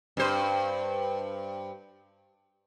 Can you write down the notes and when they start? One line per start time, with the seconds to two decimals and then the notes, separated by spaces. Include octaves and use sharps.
0.17 G2 C5